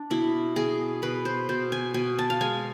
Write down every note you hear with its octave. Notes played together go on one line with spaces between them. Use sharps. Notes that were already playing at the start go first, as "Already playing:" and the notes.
Already playing: D4
B2 E4
B2 G#4
B2 B4
C5
B2 C5
G#5
B2 G#5
A5
F5
G#3 G#5